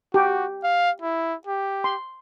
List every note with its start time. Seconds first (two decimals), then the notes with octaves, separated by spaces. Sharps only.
0.14 F#4 G4
0.64 F5
1.02 E4
1.47 G4
1.84 C6